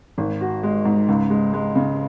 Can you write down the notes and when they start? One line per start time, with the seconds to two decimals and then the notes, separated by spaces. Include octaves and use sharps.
0.18 G#1
0.41 F#4
0.63 G#3
0.85 G#2
1.09 C#2
1.30 G#3
1.53 G#3
1.75 C#3